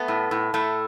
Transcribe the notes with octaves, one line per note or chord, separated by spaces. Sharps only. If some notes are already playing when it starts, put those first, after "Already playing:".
Already playing: A3 B3
A2
A2
A2 A3